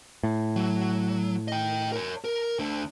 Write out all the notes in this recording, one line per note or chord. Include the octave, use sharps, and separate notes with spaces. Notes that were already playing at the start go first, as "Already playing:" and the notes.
A2
F#3
D#5 G5
A#4 C#5
A#4
D2 D3